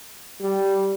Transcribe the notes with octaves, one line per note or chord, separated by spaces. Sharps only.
G3